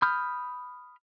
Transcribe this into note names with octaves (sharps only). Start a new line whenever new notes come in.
B5 D#6 F6 G6